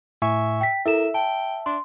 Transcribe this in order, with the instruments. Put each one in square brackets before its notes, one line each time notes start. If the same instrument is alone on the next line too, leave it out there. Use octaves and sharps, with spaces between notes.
[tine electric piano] A2 G#5 C#6 [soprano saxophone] E5
[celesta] G5 B6
[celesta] E4 A4 E7 [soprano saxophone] A#4 [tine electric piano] E5
[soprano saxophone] G5 [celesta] A5
[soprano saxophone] D4 [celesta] C6